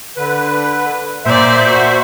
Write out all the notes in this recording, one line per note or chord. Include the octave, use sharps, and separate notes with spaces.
D3 B4
A#2 C5 D5 E5
F#4